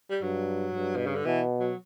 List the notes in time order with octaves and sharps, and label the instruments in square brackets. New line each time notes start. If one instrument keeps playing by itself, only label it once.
[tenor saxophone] G3
[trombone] G2 [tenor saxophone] F#3
[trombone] G2
[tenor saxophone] B2
C#3
D3
[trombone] B2 [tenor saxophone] E3
[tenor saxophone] F#3